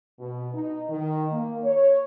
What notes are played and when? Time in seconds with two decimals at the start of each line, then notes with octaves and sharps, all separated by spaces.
0.19 B2
0.54 D#4
0.90 D#3
1.31 A#3
1.63 C#5